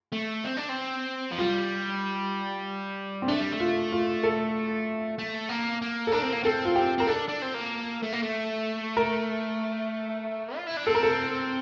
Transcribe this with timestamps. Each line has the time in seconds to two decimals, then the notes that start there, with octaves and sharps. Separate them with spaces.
0.12 A3
0.44 C4
0.57 D4
0.69 C4
1.31 F3
1.38 G3 F4
3.22 C4
3.28 A3 D4
3.40 G3
3.52 A3
3.60 F4
3.92 F4
4.23 A4
5.19 A3
5.49 A#3
5.82 A#3
6.07 A4
6.12 D4 A#4
6.22 C4
6.33 A#3
6.44 C4 A4
6.65 F4
6.76 G4
6.98 C4 A#4
7.07 D4 A4
7.28 D4
7.42 C4
7.54 A#3
8.03 A3
8.13 A#3
8.23 A3
8.97 A#4
10.56 F4
10.67 E4
10.77 D4
10.86 C4 A4
10.95 A#4
11.03 A4